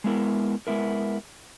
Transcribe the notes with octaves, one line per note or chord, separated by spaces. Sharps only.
G#3 B3 E4 A#4
G#3 B3 E4 A#4